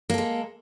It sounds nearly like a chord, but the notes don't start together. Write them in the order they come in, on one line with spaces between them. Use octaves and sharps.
A#3 A4 G#3